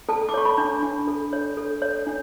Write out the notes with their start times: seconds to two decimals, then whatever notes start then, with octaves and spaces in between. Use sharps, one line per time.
0.09 A4 A5
0.29 D6
0.34 C#5 C#6
0.45 B5
0.58 D4
0.83 D4
1.07 A4
1.33 C#5
1.57 A4
1.82 C#5
2.07 D4